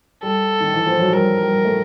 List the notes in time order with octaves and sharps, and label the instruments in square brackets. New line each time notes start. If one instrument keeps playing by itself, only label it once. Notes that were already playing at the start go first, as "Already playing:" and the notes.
[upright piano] G3 [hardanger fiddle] A4
[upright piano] D#3
E3
F3
F#3
[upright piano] G3 [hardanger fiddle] A#4
[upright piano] G3
A3